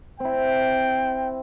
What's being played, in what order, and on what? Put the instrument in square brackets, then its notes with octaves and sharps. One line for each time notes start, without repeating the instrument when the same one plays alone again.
[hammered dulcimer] C4 E4 [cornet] G5